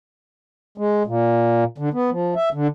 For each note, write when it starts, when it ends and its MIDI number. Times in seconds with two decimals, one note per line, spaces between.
0.78 1.03 56
1.07 1.64 46
1.78 1.89 50
1.93 2.10 59
2.11 2.34 53
2.36 2.49 76
2.53 2.67 50